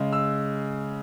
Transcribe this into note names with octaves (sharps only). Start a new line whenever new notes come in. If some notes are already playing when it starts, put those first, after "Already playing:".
Already playing: C#3 G#3
E6